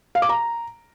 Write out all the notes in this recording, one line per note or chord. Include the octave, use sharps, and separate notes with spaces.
F5
D6
A#5